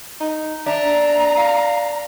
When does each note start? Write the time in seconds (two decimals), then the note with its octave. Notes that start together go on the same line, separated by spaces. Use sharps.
0.21 D#4
0.66 D4 E5 A#5
1.37 F5